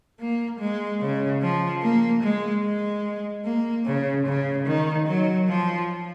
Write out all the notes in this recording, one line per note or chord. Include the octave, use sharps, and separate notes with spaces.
A#3
G#3
C#3
F3
A#3
G#3
G#3
A#3
C#3
C#3
D#3
F#3
F3